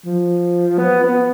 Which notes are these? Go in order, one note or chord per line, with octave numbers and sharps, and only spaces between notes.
F3
B3
B3